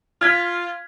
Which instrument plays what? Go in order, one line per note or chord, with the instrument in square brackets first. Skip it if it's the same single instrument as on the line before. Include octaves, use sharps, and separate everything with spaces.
[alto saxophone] F4 [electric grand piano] F6 G#6 B6